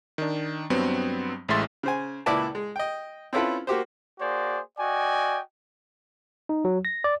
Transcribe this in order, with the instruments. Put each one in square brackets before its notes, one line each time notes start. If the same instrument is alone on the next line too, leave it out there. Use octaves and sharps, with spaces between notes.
[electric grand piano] D#3 D4
G2 F#3 B3 C4
A1 A2 G#3 E5 C6 A6
[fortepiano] C#3 C5 G#5
C#2 A#2 E4 B4 D5 A5
G#3
D#5 G5
C4 C#4 E4 F4 A4 B4
A#3 F#4 G4 C5
[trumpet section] A#3 F#4 G#4 C5 D5
F#4 D5 D#5 G5 G#5
[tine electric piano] D#4
F#3
A#6
D5